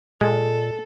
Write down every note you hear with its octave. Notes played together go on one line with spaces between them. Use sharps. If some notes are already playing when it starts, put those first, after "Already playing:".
A#2 G#3 A4